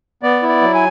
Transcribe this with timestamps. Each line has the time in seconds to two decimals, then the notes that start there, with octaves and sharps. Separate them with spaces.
0.23 B3 D5
0.42 E4
0.49 D5
0.62 F#3
0.74 G#5